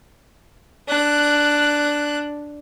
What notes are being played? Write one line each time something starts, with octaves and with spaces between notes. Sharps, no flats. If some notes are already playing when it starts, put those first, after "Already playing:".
D4 F#6